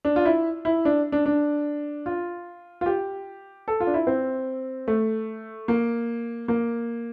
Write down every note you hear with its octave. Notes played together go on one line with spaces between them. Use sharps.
D4
F4
E4
E4
D4
D4
D4
F4
F4
G4
A4
F4
D4
E4
C4
A3
A#3
A#3